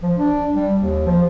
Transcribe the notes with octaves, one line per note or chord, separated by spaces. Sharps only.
F3
D4
G3
D#2
F3